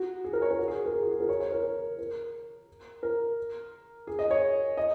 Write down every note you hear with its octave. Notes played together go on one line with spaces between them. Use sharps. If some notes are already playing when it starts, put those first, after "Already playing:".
Already playing: F#4
G#4
A#4
C#5
A#4
F#4
G#4
A#4
G#4
F#4
G#4
A#4
C#5
C#5
A#4
A#4
A#4
A#4
G#4
D#5
C#5
D#5